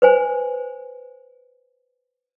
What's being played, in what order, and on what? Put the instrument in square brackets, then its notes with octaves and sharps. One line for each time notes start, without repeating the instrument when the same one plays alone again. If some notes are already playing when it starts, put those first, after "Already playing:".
[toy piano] B4 C5 G#5